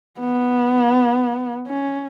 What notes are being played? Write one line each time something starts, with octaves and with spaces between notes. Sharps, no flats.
B3
C#4